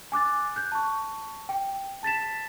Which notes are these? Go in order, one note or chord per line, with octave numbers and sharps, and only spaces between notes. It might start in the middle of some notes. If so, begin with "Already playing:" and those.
G#5 D6 F#6 A6
F#6 G6
A5 C#6
G5
A5 A6 B6 E7